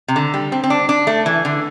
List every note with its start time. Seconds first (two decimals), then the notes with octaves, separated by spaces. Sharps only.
0.08 C3
0.16 D3
0.34 G3
0.52 C4
0.64 C4
0.70 D4
0.89 D4
1.07 A3
1.26 E3
1.45 D3